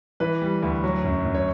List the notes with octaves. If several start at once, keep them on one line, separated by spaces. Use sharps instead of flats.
E3 B4
G3
D2
F#3
F#2
F#2
C#5